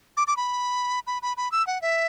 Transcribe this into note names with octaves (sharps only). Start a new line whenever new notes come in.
D6
D6
B5
B5
B5
B5
E6
F#5
E5